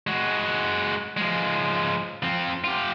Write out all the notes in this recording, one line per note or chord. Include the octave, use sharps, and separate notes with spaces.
G#3 F#4
F3 G#3
F3 C4
F4 G4